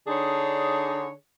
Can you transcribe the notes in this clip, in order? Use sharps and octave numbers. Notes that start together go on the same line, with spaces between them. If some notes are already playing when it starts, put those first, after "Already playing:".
D3 D4 D#4 G#4 C#5